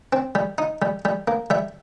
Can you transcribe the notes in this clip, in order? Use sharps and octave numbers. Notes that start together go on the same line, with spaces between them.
C4
G3
D#4
G3
G3
A#3
G3 E5